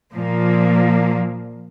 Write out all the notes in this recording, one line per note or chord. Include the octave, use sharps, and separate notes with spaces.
A#2 F3 A#3